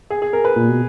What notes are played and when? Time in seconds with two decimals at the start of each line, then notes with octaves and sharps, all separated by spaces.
0.10 G#4
0.22 G#4
0.33 A#4
0.45 B4
0.56 A#2
0.69 B2